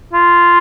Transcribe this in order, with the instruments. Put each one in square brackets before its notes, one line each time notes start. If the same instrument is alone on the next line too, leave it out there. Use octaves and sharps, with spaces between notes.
[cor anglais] F4